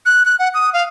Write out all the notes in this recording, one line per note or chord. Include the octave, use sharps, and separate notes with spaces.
F#6
F#6
F#5
D#6
F5